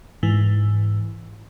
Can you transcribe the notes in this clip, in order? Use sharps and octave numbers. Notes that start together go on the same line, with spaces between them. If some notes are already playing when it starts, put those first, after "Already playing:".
G#2 E3